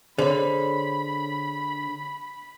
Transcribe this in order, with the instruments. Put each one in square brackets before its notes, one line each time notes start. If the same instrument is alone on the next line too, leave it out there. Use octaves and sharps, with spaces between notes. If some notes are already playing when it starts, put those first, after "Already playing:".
[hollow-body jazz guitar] D3 [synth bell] G#4 C#5 [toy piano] C5 [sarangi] B5